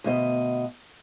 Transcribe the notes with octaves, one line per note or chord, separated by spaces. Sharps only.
D2 B2 D#5